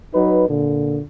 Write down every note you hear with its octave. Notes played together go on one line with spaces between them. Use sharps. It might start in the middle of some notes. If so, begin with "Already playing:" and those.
F#3 D#4 B4
A#2 D3